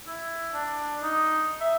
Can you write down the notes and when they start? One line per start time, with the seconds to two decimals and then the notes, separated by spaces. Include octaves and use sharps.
0.07 E4
0.54 D4
1.02 D#4
1.61 E5